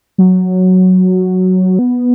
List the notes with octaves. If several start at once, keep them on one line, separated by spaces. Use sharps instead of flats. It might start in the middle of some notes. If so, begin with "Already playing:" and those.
F#3
B3